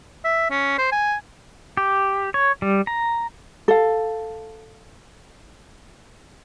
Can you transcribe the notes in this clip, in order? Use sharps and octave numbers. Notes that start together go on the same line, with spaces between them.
E5
C#4
C5
G#5
G4
C#5
G3
A#5
A4 F5